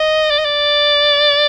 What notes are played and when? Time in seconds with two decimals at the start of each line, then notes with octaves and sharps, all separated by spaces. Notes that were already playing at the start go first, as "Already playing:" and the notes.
Already playing: D#5
0.31 D5
0.39 D#5
0.45 D5